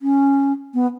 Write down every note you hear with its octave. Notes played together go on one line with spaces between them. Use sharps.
C#4
B3